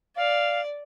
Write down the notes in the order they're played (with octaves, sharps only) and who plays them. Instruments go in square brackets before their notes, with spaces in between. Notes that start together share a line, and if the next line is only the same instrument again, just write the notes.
[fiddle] D5 [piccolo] F5